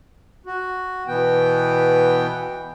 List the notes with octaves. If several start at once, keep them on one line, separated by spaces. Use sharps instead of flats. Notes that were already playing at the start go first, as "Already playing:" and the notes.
F#4
B2 E3 B3 G5